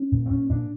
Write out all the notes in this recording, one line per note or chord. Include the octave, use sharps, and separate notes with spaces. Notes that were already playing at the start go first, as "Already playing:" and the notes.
Already playing: C#4
A#2
C4
A#2 C#4
A#2 D4